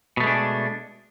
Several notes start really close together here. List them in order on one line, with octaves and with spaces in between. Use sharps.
B2 A3 G#3 D4